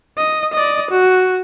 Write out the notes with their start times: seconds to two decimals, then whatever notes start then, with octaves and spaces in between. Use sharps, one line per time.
0.17 D#5
0.53 D5 D#5
0.90 F#4